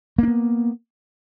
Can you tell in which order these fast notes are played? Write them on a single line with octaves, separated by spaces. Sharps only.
A#3 D4 B3